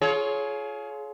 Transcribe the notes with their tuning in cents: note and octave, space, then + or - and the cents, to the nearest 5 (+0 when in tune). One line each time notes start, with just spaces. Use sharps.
F4 +0 G#4 +35 C#5 +5